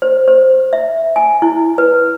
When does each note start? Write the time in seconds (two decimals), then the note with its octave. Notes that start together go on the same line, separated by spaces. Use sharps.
0.02 C5
0.28 C5
0.73 E5
1.16 G#5
1.42 E4
1.78 B4